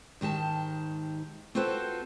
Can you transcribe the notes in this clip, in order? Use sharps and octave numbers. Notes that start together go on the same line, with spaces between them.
G#2 D#3 G4 A5
C4 F4 F#4 A4 B4 C5